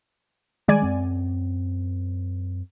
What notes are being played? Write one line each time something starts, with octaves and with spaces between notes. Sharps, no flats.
D#3 G3 G#3 D5 G#5
F#2 C4